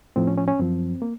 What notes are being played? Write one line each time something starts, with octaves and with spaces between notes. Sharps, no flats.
A2 F3 C4
C#4
C#4
C#4
F#2 F3 C4
A#3